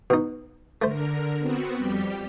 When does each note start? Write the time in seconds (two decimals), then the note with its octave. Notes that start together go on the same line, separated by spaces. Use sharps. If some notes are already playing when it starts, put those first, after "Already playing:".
0.10 B2 D#4
0.82 D3 A3 A#4 C5
1.38 B3 C4 F#4
1.77 F2 G3 G4